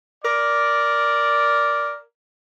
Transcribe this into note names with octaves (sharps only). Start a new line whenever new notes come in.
A#4 D5